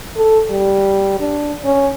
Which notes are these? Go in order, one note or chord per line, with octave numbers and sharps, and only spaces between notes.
A4
G3
D4
C#4